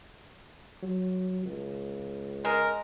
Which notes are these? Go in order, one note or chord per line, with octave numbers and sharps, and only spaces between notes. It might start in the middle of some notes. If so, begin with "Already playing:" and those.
F#3
C#2
G#3 A#4